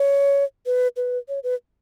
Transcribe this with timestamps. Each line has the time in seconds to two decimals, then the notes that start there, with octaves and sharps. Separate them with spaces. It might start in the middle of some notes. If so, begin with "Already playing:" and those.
Already playing: C#5
0.66 B4
0.97 B4
1.28 C#5
1.43 B4